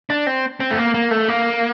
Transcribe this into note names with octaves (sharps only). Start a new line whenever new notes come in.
D4
C4
C4
A3
A#3
A#3
A3
A#3